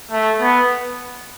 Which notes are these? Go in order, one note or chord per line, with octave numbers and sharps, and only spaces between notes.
A3
B3